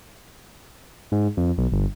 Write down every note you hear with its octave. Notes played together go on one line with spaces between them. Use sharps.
G#2
F2
B1
G1